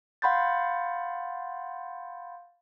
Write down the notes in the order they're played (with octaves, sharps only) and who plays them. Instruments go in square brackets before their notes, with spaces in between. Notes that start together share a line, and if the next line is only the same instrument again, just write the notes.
[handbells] F5 F#5 B5 C6 G6 A6